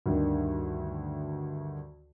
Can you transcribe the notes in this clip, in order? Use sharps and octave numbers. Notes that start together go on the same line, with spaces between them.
D2 G2 D3 D#3